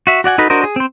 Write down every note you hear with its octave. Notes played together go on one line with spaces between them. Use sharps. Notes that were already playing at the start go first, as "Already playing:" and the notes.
F#4 E5
F#4 D5 F#5 G#5
D#4 F#4 A4 B4 D#5
D4 F#4 A#4 C5 D#5
G#4
C4 C5